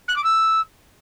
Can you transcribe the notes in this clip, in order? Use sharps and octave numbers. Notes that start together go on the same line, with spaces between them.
F#6
D6
E6